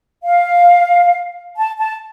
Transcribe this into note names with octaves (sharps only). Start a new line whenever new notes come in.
F5
A5
A5